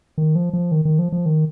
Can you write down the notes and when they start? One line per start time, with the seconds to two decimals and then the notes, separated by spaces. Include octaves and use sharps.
0.18 D#3
0.35 F3
0.53 F3
0.72 D#3
0.85 D#3
0.99 F3
1.12 F3
1.26 D#3